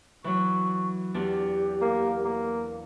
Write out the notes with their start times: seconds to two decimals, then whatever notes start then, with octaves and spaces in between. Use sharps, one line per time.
0.24 E3 F#3 C#6
1.14 E2 D4 G4
1.82 A#3
2.25 A#3